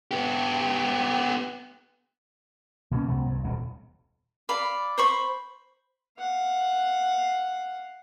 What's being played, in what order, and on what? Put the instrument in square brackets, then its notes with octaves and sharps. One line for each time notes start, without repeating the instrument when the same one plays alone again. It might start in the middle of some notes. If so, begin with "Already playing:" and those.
[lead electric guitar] B3 G4
[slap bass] B2 A#3 C4 C#4
C#2 C3 F#3 B3
C2 G2
D#1 B1 C3
[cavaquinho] D5 F5 B5
C5 B5 C#6
[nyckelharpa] F5 F#5